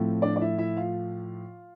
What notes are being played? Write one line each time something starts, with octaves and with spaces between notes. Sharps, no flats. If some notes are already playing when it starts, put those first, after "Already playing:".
Already playing: A2 F3 A3 C4
D4 D5
D5
E4 E5
E4 E5
F4 F5